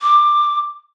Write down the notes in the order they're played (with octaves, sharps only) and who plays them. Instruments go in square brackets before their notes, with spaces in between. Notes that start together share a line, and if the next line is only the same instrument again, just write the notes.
[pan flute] D6